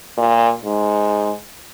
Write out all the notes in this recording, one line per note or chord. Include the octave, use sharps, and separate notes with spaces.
A#2
G#2